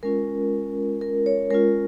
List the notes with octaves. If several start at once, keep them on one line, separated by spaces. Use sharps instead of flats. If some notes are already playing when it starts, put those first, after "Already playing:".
G#3 C#4 F4 A#4
A#4
C#5
G#3 C#4 F4 A#4